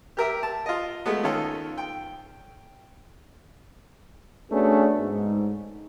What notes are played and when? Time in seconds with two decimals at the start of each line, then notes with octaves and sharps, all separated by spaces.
0.17 G4 A#4 E5
0.43 A5
0.66 F4 D#5
1.06 G#3 A3 B3
1.23 D#3 C#4 F4 A4
1.78 G5
4.51 A3 B3 C#4 D4 F#4 G#4
5.00 G#2